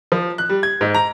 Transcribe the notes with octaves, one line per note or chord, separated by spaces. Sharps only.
F3
F#6
G3
G#6
G#2
A#5